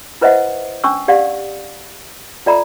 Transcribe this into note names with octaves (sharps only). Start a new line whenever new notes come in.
E4 B4 C5 D#5 E5 F#5
C#4 D4 C#6 E6
G4 D5 F5 F#5
F4 A4 D5 E5 A#5 B5